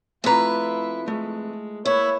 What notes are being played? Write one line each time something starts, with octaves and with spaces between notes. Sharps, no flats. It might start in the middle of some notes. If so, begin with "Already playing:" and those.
F2 A3 E4 F4 B4 A#5
G#3 A3
A#3 E4 B4 C#5